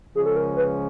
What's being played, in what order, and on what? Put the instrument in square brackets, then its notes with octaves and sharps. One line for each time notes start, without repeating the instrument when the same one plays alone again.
[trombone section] C#2 C#3 F3 G#3 C#4 [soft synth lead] G#4
[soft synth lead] A4
A#4
B4